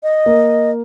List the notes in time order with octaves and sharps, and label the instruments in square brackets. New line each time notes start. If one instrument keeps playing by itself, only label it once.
[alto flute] D#5
[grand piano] A#3